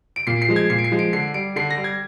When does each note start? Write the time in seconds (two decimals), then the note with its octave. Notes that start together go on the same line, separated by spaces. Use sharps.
0.16 D7
0.27 A#2 C7
0.42 C7
0.49 F3 G#3
0.56 G#6
0.70 A#2 C7
0.79 D7
0.84 C7
0.92 F3 G#3
0.99 D7
1.13 D3 C7
1.34 G3 D7
1.56 D3 C7
1.71 A#6
1.77 G3
1.84 G#6